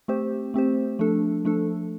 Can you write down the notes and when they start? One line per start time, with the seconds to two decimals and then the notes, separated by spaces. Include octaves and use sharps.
0.08 A3 C4 G4 C5
0.54 A3 C4 G4 C5
0.99 F3 A3 D4 A4
1.45 F3 A3 D4 A4